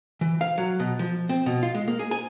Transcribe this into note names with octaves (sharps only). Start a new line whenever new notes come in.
E3
F5
F#3
B2
F3
C4
B2
F4
G#3
A#3
G#4
G#5